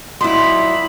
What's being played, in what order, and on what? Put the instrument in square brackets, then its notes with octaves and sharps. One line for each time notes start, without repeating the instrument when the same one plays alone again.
[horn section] A#2 D#4 B5 [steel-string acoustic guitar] F#3 E4 [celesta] C6